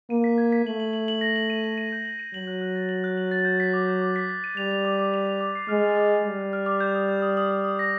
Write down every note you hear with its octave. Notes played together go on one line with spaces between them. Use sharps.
A#3 D#7
B6
G#6
B6
A3 F#7
F#7
F#7
F#7
A#6
F#7
D#7
F#7
D#7
G6
F#7
D#7
F#3 F#7
F#6
F#6
A6
F#7
F#6
F#7
A6
G6
B6
D6
G6
D6
B6
B6
D#7
G3 F7
F7
D6
D6
F7
F7
D6
C7
G#3 F6
A6
D6
D6
G3 D6
F6
F6
D6
G6
D#6
G6
D#6
D#6
D#6
D#6
A#6